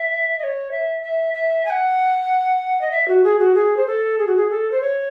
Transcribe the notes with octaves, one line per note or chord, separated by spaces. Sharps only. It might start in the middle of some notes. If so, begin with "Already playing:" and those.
Already playing: E5
D#5
C#5
E5
E5
E5
G#5
F#5
D#5
E5
F#4
G#4
F#4
G#4
C5
A4
G#4
F#4
G#4
A4
C5
C#5